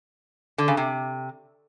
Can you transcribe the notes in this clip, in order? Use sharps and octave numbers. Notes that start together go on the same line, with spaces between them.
D3
C#3
C3